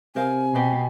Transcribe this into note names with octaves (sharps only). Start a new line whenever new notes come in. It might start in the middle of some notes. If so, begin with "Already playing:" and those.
C3 A#4 C5 F5 G#5
B2 F#4 G4 B4